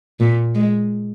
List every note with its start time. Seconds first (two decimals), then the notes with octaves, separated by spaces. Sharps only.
0.20 A#2
0.55 G#3